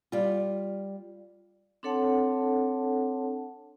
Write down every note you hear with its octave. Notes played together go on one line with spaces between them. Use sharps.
G3 F4
C4 D4 A4 C#5 F#5 A5